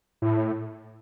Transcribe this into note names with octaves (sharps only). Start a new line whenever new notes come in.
A2